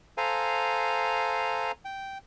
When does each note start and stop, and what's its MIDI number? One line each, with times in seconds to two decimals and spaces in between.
0.18 1.72 69
0.18 1.72 72
0.18 1.72 77
0.18 1.72 80
0.18 1.72 82
1.85 2.18 79